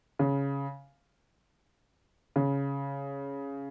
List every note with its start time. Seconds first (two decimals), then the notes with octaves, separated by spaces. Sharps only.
0.19 C#3
2.36 C#3